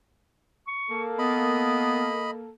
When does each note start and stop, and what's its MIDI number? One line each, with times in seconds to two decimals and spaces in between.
0.68 1.02 85
0.89 2.51 58
0.89 2.51 69
1.19 2.11 59
1.19 2.31 75
1.19 2.31 83